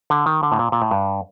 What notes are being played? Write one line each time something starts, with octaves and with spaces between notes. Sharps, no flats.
D3
D#3
D3
A2
A#2
A#2
A2
G2